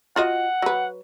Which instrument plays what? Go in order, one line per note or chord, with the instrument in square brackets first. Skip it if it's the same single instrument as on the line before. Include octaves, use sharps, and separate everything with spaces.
[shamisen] F4 F#4 D#5 [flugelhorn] F#5
[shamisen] F#3 B4